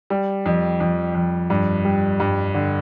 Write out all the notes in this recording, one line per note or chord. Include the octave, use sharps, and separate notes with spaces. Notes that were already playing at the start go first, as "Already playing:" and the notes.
G3
F2
F2
F2
G2
G3
G2
D3